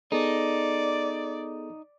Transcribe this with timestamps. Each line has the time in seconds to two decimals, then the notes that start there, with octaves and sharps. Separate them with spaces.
0.12 B3 D#4 G#4 A4 D5